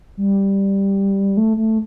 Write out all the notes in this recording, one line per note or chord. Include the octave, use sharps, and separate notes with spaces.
G3
A3
A3